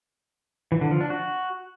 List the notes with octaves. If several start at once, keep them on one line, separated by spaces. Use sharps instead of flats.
E3
D3
F3
D4
F#4